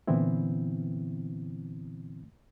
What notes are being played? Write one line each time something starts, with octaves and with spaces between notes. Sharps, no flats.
A#2 D3 E3 B3 C4 E4